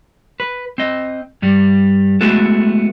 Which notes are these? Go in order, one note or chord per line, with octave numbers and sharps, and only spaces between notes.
B4
C4 D#5
G2 G3
G#3 A3 B3 E4 F#4 A4